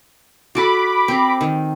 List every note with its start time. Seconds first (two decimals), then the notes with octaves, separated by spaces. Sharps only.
0.55 F#4 A4 B5 D6
1.08 C4 A#4
1.41 D#3